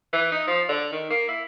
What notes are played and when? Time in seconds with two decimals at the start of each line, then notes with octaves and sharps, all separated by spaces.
0.13 E3
0.32 D#4
0.47 F3
0.69 D3
0.92 D#3
1.10 A#3
1.28 E4